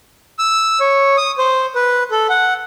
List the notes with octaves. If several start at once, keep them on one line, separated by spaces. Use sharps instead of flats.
E6
C#5
D#6
C5
B4
A4
F#5